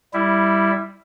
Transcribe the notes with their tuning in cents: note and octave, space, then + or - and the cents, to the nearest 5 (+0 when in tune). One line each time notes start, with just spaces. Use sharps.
G3 +0 E4 +0